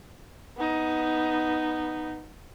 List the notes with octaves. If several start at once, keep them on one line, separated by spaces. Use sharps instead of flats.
B3 D#4